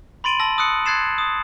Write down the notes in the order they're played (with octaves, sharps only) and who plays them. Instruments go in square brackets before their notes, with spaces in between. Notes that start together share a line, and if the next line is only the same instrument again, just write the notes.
[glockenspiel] B5 C6 A6 D7 D#7 F#7
A5 E6 A#6 F#7
D#6 E6 F#6 C#7
C6 F#6 G#6 A6 C7 E7
D#6